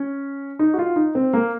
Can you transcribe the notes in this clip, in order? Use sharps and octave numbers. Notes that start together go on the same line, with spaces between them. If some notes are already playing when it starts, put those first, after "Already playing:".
Already playing: C#4
D#4
F#4
F4
D#4
C4
A#3